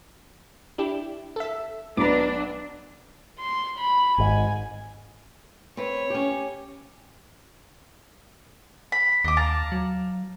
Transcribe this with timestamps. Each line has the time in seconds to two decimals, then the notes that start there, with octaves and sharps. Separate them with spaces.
0.78 D4 E4 G4
1.36 A4 E5
1.97 B1 D4 B4 A#5 D6
3.39 C6
3.78 B5
4.18 G#1 G#2 G#5
5.77 C4 B4 C#5
6.10 C#4 G4
8.92 B5
9.24 D#2 D#5 D6
9.37 F5 A5 A#5
9.72 F#3